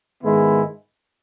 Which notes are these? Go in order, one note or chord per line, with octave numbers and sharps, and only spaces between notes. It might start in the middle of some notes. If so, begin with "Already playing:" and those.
G#2 D#3 G#3 B3 E4